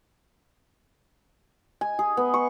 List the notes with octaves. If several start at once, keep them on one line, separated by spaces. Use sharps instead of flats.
G#5
G#4
B3
C#6